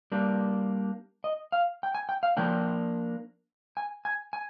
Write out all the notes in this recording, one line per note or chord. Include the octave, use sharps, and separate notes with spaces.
G3 A#3 D4
D#5
F5
G5
G#5
G5
F5
F3 A#3 D4 G5
G#5
G#5
G#5